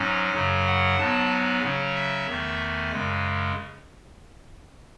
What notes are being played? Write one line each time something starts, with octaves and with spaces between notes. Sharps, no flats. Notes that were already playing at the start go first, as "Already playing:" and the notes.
Already playing: G#2 F#3 C#4 G#5
F#2 C#3 F#3
F#5
G#2 F#3 B3 A5
G#5
C#3 F#3 C#4
E5
E2 D#3 A3
G#5
F#2 C#3 G#3